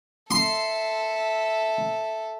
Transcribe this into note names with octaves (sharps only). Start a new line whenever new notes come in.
A4 E5 C6